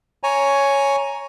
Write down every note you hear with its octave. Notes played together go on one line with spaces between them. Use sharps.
C#5 G#5 A#5